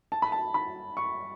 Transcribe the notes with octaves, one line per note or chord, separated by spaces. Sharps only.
A5
B5
A5
B5
C#6